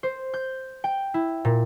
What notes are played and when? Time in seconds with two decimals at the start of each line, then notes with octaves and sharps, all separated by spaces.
0.03 C5
0.34 G6
0.84 G5
1.14 E4
1.45 A#2